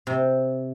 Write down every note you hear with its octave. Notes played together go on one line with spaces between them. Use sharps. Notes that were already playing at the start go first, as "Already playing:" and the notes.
C3